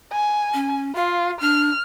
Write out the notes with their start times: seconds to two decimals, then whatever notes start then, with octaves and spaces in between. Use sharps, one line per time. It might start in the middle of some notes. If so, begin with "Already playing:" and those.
0.12 G#5
0.54 C#4
0.95 F4 F5
1.41 D4 F6